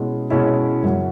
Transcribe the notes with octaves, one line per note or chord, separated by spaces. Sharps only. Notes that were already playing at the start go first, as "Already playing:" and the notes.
Already playing: B2 G#3 C#4 E4
B2 G#3 C#4 E4
F#2 C#3 F#3